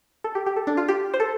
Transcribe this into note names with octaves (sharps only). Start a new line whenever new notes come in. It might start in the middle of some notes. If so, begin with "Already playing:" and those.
A4
G4
G4
A4
D4
F4
G4
C5
A4